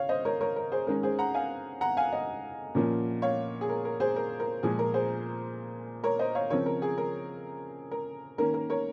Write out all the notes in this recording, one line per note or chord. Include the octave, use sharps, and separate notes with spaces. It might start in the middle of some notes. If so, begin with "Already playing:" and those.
Already playing: C#3 C#5 F5
C5 D#5
A#4 C#5
A#4 C#5
A#4
G#4 C5
D#3 G#3 C#4 A#4
G#4 C5
F#5 A#5
F5 G#5
F#5 A#5
F5 G#5
D#5 F#5
A#2 F3 A#3 C#4
C#5 F5
G#4
A#4
A#4
G#4 C5
A#4
A#4
A#2 F3 G#3 G#4
A#4
G#4 C5
A#4 C#5
C5 D#5
C#5 F5
C#3 F3 C4 A#4 C#5
A#4
G#4
A#4
A#4
D#3 A#3 C#4 A#4
A#4
A#4 C#5